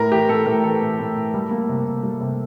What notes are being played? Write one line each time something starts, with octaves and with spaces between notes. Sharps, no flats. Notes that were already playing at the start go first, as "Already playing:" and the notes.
Already playing: A2 A#4
E3 G4
A2 A4
A2 A#4
E3 A4
A2
A2
A2
G3
A#3
C3
C3
G3
C3